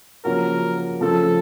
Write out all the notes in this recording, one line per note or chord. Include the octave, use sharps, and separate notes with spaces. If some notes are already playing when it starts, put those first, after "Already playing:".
C#3 F3 A#3 C#4 F#4 A#4
C#3 F3 A3 A4